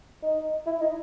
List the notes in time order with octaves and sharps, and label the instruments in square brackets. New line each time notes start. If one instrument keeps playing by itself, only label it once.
[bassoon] D#4
E4
D#4